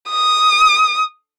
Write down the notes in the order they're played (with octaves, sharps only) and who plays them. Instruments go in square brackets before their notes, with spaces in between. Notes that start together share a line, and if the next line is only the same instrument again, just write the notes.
[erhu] D#6